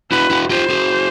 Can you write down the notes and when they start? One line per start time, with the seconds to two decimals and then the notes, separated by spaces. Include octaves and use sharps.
0.11 E4 F#4 B4
0.30 E4 F#4
0.50 F4 G4 C5
0.70 F#4 G#4